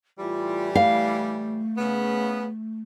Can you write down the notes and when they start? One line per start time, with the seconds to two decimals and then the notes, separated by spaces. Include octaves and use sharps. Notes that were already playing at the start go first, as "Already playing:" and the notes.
0.19 A2 E3 G3 F4
0.75 A3 F5
1.77 C#3 B3